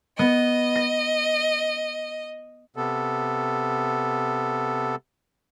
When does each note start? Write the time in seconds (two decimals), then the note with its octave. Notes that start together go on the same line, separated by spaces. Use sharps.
0.19 B3 D#5
0.75 A#6
2.76 C3 B3 A4